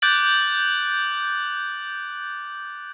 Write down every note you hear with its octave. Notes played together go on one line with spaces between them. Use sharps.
D6 F#6 G6 A6 D7 F#7